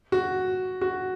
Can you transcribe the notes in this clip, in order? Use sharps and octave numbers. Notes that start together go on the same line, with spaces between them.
F#4
F#4